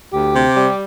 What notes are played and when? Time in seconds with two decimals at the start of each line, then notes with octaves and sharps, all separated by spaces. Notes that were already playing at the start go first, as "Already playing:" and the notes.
0.13 D2 G4
0.35 C3
0.57 G3